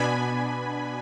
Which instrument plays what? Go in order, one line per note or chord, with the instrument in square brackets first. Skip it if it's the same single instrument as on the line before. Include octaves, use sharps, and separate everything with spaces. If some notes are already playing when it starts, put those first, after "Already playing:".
Already playing: [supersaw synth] B2 B3 D4 G#5 B5